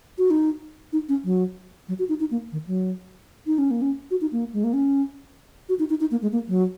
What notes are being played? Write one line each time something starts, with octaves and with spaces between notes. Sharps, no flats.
F#4
D#4
D#4
C#4
F#3
F#3
F#4
D#4
D#4
A#3
D#3
F#3
D#4
C#4
A#3
C#4
F#4
D#4
A#3
G#3
A#3
C#4
F#4
D#4
D#4
D#4
A#3
G#3
A#3
F#3